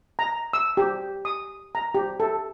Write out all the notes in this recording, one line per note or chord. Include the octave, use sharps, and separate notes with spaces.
A#5
E6
G4
D#6
A#5
G4
A4